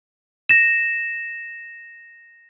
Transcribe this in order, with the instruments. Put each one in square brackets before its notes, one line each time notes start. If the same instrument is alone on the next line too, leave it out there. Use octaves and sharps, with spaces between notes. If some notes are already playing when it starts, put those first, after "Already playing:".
[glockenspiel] A#6 E7